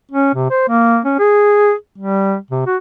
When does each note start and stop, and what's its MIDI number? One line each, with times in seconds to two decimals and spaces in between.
0.12 0.33 61
0.34 0.49 48
0.50 0.67 72
0.69 0.99 58
1.05 1.15 61
1.19 1.73 68
1.99 2.36 55
2.51 2.62 48
2.66 2.77 66